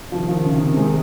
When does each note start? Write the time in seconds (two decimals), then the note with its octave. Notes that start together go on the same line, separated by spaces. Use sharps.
0.11 C3 D#3 F3
0.29 F3
0.44 C#3
0.60 C#3
0.77 G#3